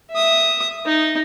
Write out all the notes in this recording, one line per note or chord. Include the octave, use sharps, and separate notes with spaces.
E5 D#6
D#4